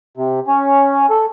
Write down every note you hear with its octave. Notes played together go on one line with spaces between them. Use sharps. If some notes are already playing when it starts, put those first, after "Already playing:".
C3
C#4
A4